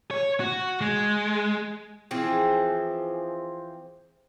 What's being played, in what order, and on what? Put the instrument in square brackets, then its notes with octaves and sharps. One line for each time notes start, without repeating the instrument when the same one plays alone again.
[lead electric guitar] C#5
F#4
G#3
[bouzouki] E3 F3 C4 G#4